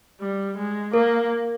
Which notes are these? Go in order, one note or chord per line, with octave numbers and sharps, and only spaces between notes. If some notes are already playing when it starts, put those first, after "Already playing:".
G3
G#3
A#3 A#4